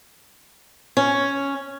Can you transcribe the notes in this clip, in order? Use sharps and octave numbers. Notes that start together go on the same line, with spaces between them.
C#4